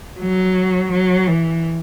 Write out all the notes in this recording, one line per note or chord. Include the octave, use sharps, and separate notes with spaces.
F#3
F#3
E3